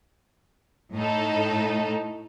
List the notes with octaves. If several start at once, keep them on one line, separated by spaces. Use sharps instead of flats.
A2 D#4 A4